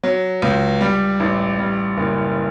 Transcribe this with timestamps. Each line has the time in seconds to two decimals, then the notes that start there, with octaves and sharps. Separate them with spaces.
0.03 F#3
0.42 C#2
0.81 G3
1.20 A1
1.59 G3
1.97 F#1